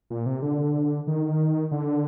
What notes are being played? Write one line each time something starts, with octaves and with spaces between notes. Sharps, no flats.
A#2
C3
D3
D#3
D3